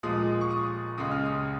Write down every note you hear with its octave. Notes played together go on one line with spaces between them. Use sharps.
A#2 F3 G#3 D#6
C#6
D#6
C#2 C#3 G#3 D#6
F6
D#6